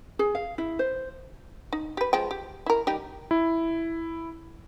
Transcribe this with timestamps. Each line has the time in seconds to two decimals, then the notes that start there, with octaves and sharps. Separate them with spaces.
0.19 G#4
0.35 F5
0.58 E4
0.79 C5
1.73 D#4
1.97 G4 B4
2.13 F3 G#3 G5
2.31 G4
2.66 E4 A#4
2.87 G3 D#4 G4
3.31 E4